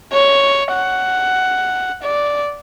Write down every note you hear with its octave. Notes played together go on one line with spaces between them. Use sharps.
C#5
F#5
D5